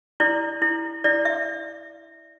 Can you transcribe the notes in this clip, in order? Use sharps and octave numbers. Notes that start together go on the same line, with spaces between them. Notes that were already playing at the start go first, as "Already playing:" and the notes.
E4 D5
E4
E4 D5
E5